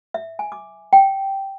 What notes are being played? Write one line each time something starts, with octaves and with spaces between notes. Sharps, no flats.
E5
G#5
D6
G5